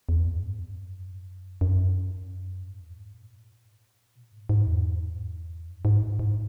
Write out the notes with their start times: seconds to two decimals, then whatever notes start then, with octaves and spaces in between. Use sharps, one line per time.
0.09 E2
0.26 F#2
0.43 G#2
0.59 F#2
1.61 F#2
2.63 G#2
2.80 E2
2.97 G#2
3.14 A#2
4.15 B2
4.32 G#2
4.49 G#2
4.67 E2
5.68 F#2
5.85 G#2
6.19 G#2